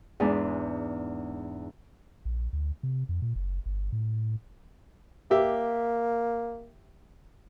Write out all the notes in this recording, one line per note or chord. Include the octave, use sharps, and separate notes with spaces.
E2 G#2 G#3 D4
A#1
D2
C3
F2
A#2
F#1
G1
A2
A#3 G4 E5